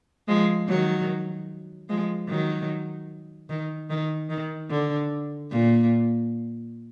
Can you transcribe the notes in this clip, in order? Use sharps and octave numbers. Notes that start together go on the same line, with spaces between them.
F3 G#3
D#3 F#3
F3 G#3
D#3 F#3
D#3
D#3
D#3
D3
A#2